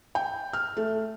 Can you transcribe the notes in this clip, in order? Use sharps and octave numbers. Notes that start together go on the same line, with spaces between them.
G5
F6
A3